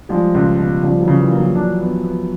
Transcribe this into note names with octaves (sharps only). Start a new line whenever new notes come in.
F3 G3 G#3
C#2
B2
C#3 F3 G3
E3 F#3
C#3
E3
A#3
E3 F#3
D4
B3
B3